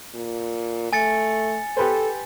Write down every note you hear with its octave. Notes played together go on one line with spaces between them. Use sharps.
A#2
A3 G#5 A6 C#7
G4 A4 B4 C5